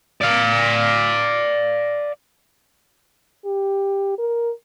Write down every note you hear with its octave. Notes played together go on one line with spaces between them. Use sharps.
D5 F5
G4
A#4